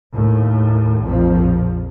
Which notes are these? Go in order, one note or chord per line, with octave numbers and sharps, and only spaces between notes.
D#2 A2
A#1 F2 F3